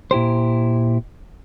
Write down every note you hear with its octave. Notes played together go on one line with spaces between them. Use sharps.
A#2 E4 G4 C5